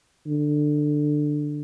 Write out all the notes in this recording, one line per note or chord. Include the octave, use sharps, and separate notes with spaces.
D3